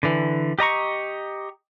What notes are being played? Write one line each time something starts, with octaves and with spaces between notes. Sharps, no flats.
D3 E3
G4 D#5 A#5 C#6